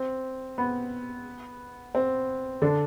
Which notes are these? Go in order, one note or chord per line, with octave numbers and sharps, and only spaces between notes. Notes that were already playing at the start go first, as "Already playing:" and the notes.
Already playing: C4
B3
C4
D3 D4